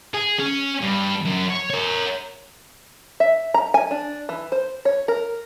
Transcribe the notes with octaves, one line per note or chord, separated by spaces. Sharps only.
G#4
C#4
G2
F#2
C#5
A#4 C#5
E5
A#5
G#5
D4
E3
C5
C#5
A#4